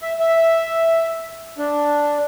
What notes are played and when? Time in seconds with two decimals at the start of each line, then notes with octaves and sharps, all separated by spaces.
0.02 E5
0.20 E5
1.58 D4